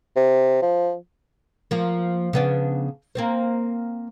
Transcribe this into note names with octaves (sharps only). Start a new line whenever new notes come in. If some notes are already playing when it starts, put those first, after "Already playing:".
C3
F3
F3 A#3
C#3 B3 D4
A#3 C4 C5